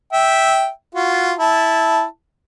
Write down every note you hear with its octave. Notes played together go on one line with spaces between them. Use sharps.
E5 G5
F4 F#4
E4 A5